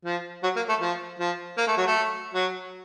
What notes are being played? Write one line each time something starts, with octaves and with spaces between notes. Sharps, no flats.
F3
F#3
A#3
A3
F3
F3
A#3
A3
F#3
A3
F#3